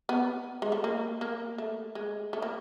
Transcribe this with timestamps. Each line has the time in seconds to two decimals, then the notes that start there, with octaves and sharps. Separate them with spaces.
0.09 B3
0.62 G#3
0.72 A3
0.84 A#3
1.21 A#3
1.58 A3
1.95 G#3
2.33 A3
2.42 A#3